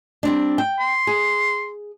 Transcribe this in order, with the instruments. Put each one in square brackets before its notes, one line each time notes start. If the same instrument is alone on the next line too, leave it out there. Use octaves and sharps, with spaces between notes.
[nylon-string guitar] G3 C4 D4
G5
[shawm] C6
[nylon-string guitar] G#4